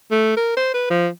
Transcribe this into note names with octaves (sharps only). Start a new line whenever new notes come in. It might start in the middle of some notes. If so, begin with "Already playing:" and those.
A3
A#4
C5
B4
F3